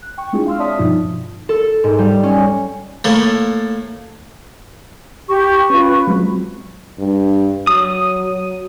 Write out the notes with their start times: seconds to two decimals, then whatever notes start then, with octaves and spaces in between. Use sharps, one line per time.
0.02 F#6
0.18 G5 C#6
0.33 G#3 C4 D4 E4 F4 G#4
0.47 F5 C6 E6 F6
0.59 C#5 D5 E5 A5 D#6 B6
0.78 G2 B2 F3 D#4 F4
1.49 A4
1.84 G#2
1.99 G3
2.23 C#4
3.04 A2 A3 A#3
5.29 G4 C#6
5.70 C#4 F4 B4
6.07 F#3 G#3 C4
6.99 G2
7.67 F#3 D#6